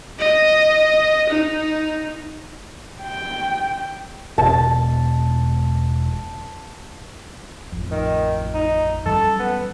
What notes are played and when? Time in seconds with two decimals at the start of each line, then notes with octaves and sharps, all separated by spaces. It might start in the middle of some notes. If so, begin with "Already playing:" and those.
0.19 D#5
1.29 D#4
3.03 G5
4.38 E1 A5
7.72 A1 F2
7.91 D#3
8.54 D#4
9.06 F#2 E3 G3 A4
9.39 B3